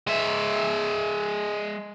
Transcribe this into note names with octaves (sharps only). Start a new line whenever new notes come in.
G#3 E5